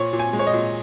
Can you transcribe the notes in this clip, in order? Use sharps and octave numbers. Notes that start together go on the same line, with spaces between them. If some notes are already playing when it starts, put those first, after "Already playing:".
Already playing: A#2 C#5
A#2
G#5
G#3
C#5
D#5
A#2